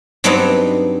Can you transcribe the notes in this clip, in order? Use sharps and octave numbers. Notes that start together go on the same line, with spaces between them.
G2 F#3 B3 C4 D4 D#4